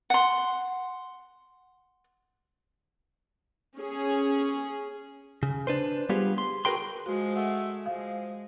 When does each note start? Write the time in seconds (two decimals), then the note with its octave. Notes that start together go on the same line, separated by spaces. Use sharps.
0.10 F#5 C6
3.77 C#4 G#4
5.43 C#3
5.67 D4 B4 C5
6.09 G3 B3 F4 G4 G#4
6.38 C6
6.65 F#4 G#4 A#4 B4 G5 C6
7.06 F3 G#3 F#4
7.36 A3 F#5
7.86 F3 G#3 F5